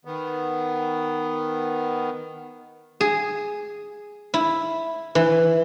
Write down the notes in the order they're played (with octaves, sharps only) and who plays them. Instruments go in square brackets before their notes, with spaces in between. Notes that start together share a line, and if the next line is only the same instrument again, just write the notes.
[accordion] D#3 B3
[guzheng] G#4
E4
E3